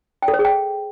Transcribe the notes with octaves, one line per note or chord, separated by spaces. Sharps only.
G5
A4
C5
G#4
G5